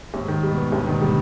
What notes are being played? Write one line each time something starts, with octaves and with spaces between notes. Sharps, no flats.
D#2 G#2
D#3
B2 G3
B3
D#2 D3
D#3
G3